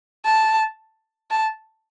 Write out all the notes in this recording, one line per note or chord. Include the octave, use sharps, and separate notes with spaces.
A5
A5